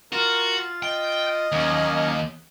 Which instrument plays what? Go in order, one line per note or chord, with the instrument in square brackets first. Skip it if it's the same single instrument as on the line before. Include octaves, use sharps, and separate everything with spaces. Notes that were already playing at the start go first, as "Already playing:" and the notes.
[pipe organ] F4 A6 [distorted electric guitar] F#4 [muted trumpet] A#4
[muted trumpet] D#5 [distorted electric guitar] G5
[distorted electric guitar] D#2 [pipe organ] F#3 A#3 C#4